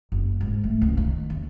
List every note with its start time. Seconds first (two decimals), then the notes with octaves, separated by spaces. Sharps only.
0.12 F#1
0.41 G#2
0.64 A3
0.82 C#2
0.97 D#3
1.30 D#2